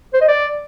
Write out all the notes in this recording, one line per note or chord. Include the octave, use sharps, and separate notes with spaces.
C5
D#5
D5